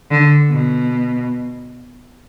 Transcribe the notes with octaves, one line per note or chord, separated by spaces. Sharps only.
D3
B2